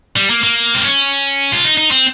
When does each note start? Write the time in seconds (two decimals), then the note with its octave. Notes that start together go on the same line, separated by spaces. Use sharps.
0.16 G3
0.30 A#3
0.43 A#3
0.75 C4
0.84 C#4
1.52 F4
1.64 D#4
1.78 D#4
1.91 C4